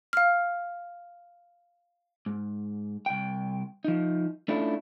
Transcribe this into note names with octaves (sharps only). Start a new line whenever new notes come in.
F5 F6
G#2
C2 G5
F3 D#4
A3 C#4 D4 E4 F4 A4